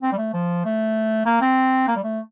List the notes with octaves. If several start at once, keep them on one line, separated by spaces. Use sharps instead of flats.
C4
G3
A3
F3
A3
A#3
C4
A#3
G3
A3